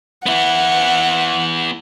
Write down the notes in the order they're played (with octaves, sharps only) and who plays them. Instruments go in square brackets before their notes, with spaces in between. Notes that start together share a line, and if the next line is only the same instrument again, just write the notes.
[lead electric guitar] B3 E4 [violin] F#5